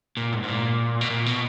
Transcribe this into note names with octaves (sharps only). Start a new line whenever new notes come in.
A#2
G#2
G#2
A#2
B2
A#2
B2